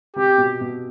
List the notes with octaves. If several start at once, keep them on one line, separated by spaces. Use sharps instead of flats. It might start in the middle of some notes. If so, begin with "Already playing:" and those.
C3 G4
B2
B2